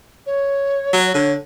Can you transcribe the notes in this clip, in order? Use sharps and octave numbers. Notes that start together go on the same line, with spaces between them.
C#5
F#3
D3 C#5